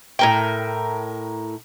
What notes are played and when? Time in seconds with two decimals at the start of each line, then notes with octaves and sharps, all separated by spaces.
0.19 A2 A#4 G5